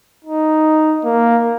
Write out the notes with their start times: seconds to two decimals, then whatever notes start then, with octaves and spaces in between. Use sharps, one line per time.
0.25 D#4
1.04 A#3